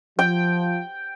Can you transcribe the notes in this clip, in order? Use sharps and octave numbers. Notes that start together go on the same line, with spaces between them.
F3 G5